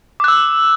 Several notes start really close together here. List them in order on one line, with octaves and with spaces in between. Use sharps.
D6 F#6 E6